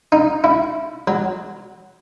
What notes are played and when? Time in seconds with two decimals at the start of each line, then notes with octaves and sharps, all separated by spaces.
0.12 D#4
0.44 E4
1.07 F#3